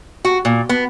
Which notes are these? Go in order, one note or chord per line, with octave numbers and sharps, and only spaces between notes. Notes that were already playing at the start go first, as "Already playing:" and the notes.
F#4
A#2
B3